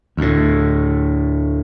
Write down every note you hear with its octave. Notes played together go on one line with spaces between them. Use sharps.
D2 A2